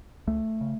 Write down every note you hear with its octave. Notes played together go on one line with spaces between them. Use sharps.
C#2 A3
C#3